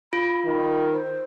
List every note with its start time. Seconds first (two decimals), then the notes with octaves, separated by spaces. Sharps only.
0.13 F4 B5
0.45 D#3
0.92 C5